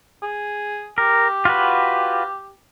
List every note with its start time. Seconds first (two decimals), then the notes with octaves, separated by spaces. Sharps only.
0.23 G#4
0.98 G4 A#4
1.45 F4 F#4 B4